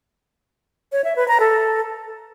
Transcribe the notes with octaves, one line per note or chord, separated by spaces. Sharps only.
C#5
E5
B4
A#5
A4